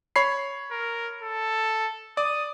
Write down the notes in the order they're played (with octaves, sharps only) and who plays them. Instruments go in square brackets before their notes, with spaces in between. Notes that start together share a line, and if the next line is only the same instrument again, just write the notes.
[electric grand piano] C#5 B5 C7
[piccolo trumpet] A#4
A4
[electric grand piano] D5 [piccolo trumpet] D#6